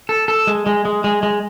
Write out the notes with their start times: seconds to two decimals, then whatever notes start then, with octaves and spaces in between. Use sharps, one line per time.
0.09 A4
0.28 A4
0.47 G#3
0.66 G#3
0.85 G#3
1.04 G#3
1.23 G#3